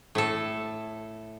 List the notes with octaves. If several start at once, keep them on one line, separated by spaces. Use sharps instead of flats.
A2 A4